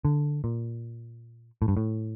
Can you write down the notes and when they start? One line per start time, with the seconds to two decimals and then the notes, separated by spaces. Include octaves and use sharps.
0.05 D3
0.44 A#2
1.62 A2
1.68 G2
1.77 A2